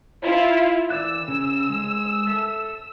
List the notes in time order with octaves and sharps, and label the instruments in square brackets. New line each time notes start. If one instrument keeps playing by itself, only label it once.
[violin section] E4 F4
[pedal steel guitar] E3 D5 F#6 [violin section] E6
[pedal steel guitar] C#3
G#3
A4 E5